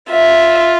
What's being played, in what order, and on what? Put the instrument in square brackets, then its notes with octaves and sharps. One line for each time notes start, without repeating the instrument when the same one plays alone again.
[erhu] F4 [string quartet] E5